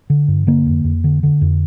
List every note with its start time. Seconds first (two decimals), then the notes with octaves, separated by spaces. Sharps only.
0.10 D3
0.28 G2
0.47 D3 A#3
0.66 F2
0.84 F2
1.04 D3
1.23 D3
1.41 F2